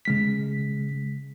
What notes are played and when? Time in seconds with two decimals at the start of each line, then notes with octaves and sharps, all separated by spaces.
0.05 C#3 G#3 B6